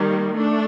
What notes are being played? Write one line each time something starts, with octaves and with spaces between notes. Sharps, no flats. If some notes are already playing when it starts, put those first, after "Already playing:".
Already playing: D#3 G3 A#3
A3 D4